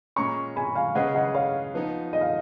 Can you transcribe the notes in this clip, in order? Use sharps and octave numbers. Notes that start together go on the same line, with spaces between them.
A#2 G#3 C#4 A#5 C#6
G#5 B5
F5 G#5
C#3 G#3 C#4 G#4 B4 D#5 F#5
D#5 F#5
C#5 F5
F3 B3 D#4
D#5
F5